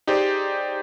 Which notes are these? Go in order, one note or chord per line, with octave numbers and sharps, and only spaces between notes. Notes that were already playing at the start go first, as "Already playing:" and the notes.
D#4 G4 G#4 C5 D5